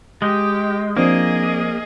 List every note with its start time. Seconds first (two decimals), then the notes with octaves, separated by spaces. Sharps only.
0.22 G#3 G4 G5 D#6 G6
0.97 F3 A#3 C4 D4 G#4 D#5